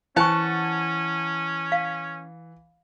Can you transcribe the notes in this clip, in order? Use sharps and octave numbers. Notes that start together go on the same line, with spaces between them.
E3 C#4 C5 F#5 G#5 A5 C#6
F5